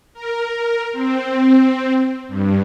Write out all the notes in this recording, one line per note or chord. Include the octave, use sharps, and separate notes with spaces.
A#4
C4
G2